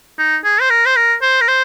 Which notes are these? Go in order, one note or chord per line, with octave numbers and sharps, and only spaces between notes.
D#4
G#4
C5
A#4
C5
A#4
C5
A#4
C5